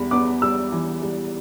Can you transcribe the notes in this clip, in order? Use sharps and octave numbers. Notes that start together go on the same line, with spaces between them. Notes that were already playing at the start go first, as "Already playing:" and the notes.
Already playing: E2 G3 B5
B3 D6
G3 E6
E3
G3